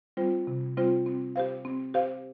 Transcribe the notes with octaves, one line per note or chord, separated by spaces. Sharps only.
G3 C4 F4 C5
C3
G3 C4 F4 C5
C4
G4 C5 F5
C4
G4 C5 F5